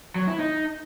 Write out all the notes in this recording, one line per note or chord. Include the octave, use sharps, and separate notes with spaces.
F#3
E4
D#4